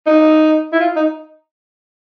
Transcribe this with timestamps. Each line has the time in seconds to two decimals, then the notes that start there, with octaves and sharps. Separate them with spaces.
0.07 D#4
0.73 E4
0.80 F4
0.96 D#4